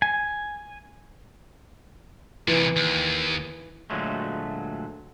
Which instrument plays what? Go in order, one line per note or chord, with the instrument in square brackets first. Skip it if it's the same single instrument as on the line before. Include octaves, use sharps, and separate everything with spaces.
[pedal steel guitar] G#5
[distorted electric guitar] C2 A#2 [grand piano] E3
[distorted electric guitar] D#2
[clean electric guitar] D2 A#2 F#3 G#3 A3